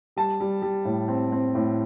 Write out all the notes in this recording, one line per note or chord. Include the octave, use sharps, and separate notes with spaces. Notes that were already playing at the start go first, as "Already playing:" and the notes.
G3 A5
G3
G3
A2
C4
C4
A2